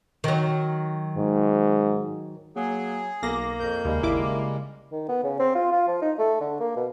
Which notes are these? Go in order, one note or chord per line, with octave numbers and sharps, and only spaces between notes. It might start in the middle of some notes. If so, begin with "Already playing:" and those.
D#3 F#3
G#2
F#3 A#3 G#4
B1 A#3 D6 A#6
F2 A#4 G6
D#2 C#3 G3 G#3
G#1 E4 D6
D#3
B3
C#3
C4
F4
F4
F3
D#4
A3
D3
A#3
B2